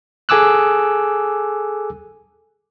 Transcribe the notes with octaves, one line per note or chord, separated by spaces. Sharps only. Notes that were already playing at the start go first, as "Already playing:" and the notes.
G#4 A4 G#5 D6 E6 F#6